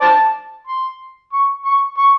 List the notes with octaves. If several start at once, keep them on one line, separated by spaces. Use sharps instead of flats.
C5 D5 A5
C6
C#6
C#6
C#6